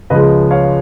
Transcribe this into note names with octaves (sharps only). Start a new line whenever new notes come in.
C#2 C#3 F3 G#3 B4 D#5
C#5 F5